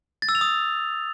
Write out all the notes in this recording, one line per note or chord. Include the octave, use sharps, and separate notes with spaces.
A6
E6
F7
D#6